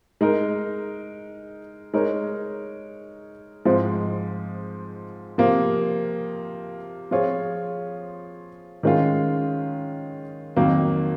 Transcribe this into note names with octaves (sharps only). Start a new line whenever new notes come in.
G#3 D#4 A#4
G#3 D#4 A#4 C#5
G#2 F3 G#3 C4
C3 F3 A#3
F3 C4 F4 G#4 C#5
D#3 G#3 C#4 F4
F2 D#3 F#3 A#3